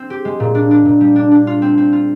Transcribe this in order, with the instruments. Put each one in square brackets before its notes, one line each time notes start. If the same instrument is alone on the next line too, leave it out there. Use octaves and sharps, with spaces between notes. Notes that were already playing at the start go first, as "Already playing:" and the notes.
Already playing: [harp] C4
G4
G#3
A#2
D4
D4
A#2
G3
D4
D4
F4
C4
C4
F4